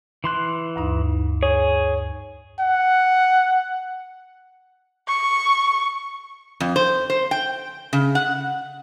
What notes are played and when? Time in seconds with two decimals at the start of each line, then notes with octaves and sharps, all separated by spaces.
0.24 E3 C6 F#6
0.76 D2 G2 D#4
1.43 G#4 C#5
2.59 F#5
5.08 C#6
6.60 F2
6.76 C5
7.10 C5
7.31 G5
7.93 C#3
8.15 F#5